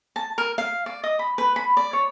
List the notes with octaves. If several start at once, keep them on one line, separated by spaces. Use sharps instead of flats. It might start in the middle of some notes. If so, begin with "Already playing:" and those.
A5
A#4
F5
D5
D#5
B5
B4
B5
D5
C#5